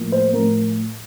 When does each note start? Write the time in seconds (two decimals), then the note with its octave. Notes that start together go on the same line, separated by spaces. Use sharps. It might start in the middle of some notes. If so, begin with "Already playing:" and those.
Already playing: A2 F3 A#3
0.12 C5
0.33 A2 F3 A3 A#4